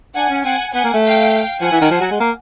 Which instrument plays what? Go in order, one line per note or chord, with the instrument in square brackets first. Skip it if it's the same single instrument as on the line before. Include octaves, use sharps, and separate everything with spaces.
[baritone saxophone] D4 [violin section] F#5 G#5
[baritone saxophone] C#4
[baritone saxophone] C4 [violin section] F#5 G#5
[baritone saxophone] B3 [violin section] F#5 G#5
[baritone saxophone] A#3
A3
[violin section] F5 G5
[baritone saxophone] F3 [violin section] F#5 G#5
[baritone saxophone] E3
D#3
F3
F#3
G#3
A#3